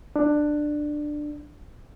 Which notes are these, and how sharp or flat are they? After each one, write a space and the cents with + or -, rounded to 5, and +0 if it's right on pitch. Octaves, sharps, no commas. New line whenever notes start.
D4 +15